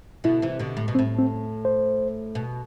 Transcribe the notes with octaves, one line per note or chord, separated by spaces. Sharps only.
B2 D3 E4
C3 E3
B2 D3
A2
B2
C4
A2
C4
C5
B2